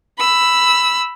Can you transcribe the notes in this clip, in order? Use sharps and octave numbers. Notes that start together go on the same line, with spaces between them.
B5 E6